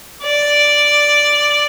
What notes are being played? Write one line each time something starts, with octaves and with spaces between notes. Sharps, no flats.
D5